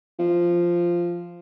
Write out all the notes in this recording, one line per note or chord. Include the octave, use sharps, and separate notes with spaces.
F3